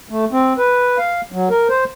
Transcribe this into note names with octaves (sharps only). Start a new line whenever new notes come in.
A3
C4
B4
F5
F#3
A#4
C5